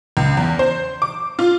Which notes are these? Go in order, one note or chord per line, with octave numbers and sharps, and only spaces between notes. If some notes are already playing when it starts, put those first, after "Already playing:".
C#2
E2
C5
D6
F4